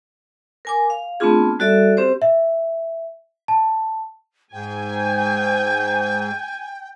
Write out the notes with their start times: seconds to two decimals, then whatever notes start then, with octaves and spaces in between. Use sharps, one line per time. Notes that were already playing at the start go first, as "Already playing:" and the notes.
0.65 A#4 G#5 D6
0.90 F5
1.20 A3 B3 C4 D4 F4 G#4
1.59 G3 F#4 A4 D5 E5
1.97 C4 G4 C5
2.22 E5
3.48 A5
4.53 G#2 G5 G#5